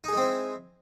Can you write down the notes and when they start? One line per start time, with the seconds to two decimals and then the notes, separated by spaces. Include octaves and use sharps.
0.04 D#4
0.08 G#4
0.13 G#3
0.17 C4
0.21 E4